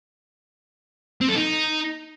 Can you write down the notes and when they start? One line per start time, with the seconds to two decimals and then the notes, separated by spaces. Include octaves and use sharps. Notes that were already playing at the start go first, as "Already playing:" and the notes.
1.21 C4
1.28 A4
1.36 D#4